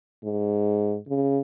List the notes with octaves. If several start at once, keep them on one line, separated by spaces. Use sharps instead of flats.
G#2
C#3